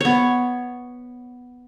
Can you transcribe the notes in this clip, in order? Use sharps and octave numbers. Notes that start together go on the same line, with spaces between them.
B3 C#5